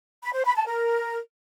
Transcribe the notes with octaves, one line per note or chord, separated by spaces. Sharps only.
B5
C5
B5
A5
A#4